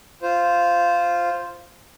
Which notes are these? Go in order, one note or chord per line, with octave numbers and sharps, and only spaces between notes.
F4 C5